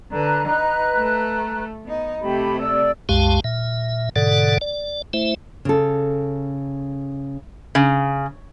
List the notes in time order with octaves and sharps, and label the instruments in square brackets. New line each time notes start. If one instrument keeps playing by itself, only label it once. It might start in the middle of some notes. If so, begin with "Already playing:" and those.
[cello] D3 [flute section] B4 A#5 F#6
[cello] D#4
A3
B3 D#4
[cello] C3 A3 [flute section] G4 B5
[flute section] D5 E6
[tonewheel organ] C2 F#2 G#3 G4 F5 A5
A#2 E5
G#2 B2 D3 A4 D5 F#5
D5
A3 E4 C5 E5
[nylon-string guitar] C#3 A4
[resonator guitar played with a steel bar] C#3